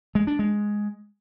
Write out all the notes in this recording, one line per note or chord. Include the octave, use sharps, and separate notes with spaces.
G#3
D4
G#3